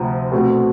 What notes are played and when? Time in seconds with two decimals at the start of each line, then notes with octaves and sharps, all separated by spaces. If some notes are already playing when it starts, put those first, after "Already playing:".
Already playing: D2 C3 F3
0.32 B2 A3 C4